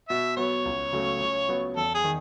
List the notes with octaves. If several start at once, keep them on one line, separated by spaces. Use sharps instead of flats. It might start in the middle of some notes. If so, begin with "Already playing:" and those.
B2 E5
F#3 B3 C#5
C#2
C#3 F#3 A3
C#3
F#3 B3
E2 A4
G#4
D#3